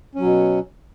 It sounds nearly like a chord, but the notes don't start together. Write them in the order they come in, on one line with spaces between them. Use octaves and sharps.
C#4 F#3 B2